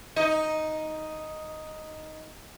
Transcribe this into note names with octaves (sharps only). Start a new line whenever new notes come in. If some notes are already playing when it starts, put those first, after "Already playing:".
D#4 D#5